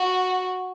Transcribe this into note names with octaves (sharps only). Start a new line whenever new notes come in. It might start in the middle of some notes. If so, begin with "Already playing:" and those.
Already playing: F#4